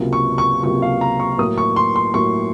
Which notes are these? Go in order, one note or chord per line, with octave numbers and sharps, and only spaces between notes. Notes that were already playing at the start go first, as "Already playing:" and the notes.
Already playing: C#2 C3 F#3 A#3
C#6
C#6
C#2 C3 F#3 A#3 C#6
F5
A#5
C#6
A2 F#3 A#3 D#6
C#6
C6
C6
A2 F#3 A#3 C#6